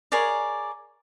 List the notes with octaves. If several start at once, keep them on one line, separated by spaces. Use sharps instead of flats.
G#4 A#4 C#5 D5